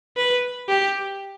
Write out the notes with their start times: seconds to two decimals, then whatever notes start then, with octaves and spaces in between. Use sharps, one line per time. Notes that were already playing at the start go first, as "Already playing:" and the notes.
0.17 B4
0.69 G4